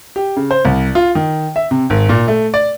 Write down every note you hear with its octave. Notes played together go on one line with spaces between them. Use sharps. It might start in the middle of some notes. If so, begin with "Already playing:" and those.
G4
C#3
C5
C2
F4
D#3
E5
C3
G#1
A#2
A3
D5